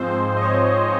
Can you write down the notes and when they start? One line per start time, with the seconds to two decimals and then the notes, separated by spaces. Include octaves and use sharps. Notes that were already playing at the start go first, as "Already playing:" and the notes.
Already playing: G#2 F3 G#3 C4 C5
0.11 C5
0.36 D#5
0.42 C#5
0.72 C5